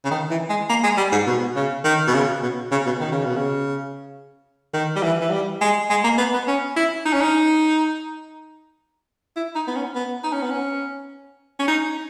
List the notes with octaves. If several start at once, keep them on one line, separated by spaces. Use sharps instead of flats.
C#3
D#3
E3
G#3
A#3
G#3
G3
G#2
B2
C#3
D#3
B2
C#3
B2
C#3
B2
D#3
C#3
B2
C#3
D#3
G3
E3
E3
G3
G#3
G#3
A#3
B3
B3
C#4
E4
D#4
C#4
D#4
E4
D#4
B3
C#4
B3
D#4
C#4
B3
C#4
C#4
D#4